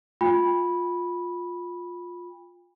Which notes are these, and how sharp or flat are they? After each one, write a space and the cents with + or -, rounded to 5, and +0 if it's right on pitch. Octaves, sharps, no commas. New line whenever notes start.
F4 +15 G5 +45 B5 -10